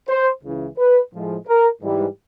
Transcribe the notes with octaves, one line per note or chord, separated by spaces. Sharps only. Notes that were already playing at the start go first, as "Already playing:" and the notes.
C5
C#2 C#3 E3
B4
A2 F3 G#3
A#4
G#2 E3 G3